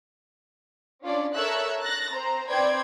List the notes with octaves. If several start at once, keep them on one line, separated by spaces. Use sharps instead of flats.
C#4 D4 F4 D5
A4 A#4 C#5 E5 E6 F#6
F#6 A6 A#6
C4 C5 A#5
C4 B4 D5 G5 C6 G#6